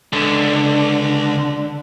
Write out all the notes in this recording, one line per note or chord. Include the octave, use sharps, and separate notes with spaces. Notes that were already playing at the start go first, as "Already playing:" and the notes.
C#2 D3